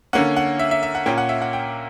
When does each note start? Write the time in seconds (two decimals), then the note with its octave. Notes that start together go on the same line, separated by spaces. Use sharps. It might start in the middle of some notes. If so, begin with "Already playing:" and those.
0.13 D3 A#3 C#4 F#5
0.37 F#5
0.59 E5
0.71 E5
0.83 E5
0.95 F#5
1.06 A#2 A#3 C#4 G5
1.18 F#5
1.29 E5
1.41 F#5
1.53 G5